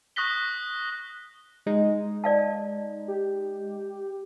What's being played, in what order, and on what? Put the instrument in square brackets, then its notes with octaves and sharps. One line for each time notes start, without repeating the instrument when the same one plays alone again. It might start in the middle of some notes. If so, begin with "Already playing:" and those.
[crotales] C#6 D#6 F#6 A#6 B6 G7
[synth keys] G#3 D#4
[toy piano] D5 F5 A5
[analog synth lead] G4